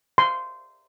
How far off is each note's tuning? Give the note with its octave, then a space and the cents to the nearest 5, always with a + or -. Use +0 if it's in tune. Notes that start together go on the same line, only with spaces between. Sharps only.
C6 -15